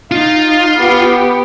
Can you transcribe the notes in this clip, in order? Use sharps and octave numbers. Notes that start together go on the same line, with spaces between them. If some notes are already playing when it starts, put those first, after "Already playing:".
D#4 F4 F5
B3 G4